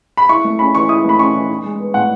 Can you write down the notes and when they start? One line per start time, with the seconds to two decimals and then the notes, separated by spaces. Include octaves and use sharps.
0.17 B5
0.29 E4 C#6
0.45 A3
0.59 C#4 B5
0.75 E3 C#6
0.89 E4 D#6
1.05 A3 B5
1.19 C#4 C#6
1.35 E3
1.49 D#4
1.64 G#3
1.80 B3
1.94 A2 F#5